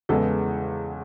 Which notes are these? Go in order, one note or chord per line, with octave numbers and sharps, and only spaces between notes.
E2 C#3 G#3 B3 A4